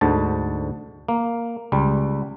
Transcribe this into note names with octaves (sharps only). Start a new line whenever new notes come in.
D2 G#2 D3 A5
A#3
C#2 G3